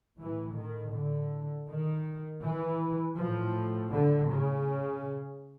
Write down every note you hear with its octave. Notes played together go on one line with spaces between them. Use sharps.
A2 E3
D#3
D3
D#3
E3
A2 F3
D3
C#3